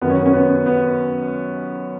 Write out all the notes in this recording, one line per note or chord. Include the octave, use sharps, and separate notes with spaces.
F#2 D#3 F#3 B3
C#4
B3
C#4
B3
B3